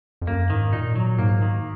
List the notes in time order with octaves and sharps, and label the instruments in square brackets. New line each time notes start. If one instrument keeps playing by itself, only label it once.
[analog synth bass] F2
[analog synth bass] F#2 [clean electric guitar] A#3
[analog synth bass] G#2 [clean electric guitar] D#3
[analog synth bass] A#2 [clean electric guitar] D#4
[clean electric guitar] F#3
[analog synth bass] G#2 [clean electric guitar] A#3
[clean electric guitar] D#3